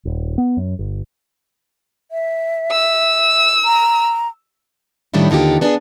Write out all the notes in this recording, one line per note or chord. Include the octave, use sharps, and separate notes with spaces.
D#1
B3
F#2
G1
E5
E6
A#5
A2 D#3 G3 C#4 D4 E4
D#2 D3 D#4 F4 G4
B3 D4 G#4